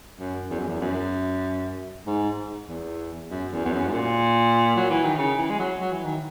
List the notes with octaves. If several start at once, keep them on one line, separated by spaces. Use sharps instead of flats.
F#2
E2
F#2
E2
F#2
G#2
E2
F#2
E2
E2
F#2
G#2
A#2
F#3
E3
D#3
C#3
E3
G#3
F#3
F#3
E3
D#3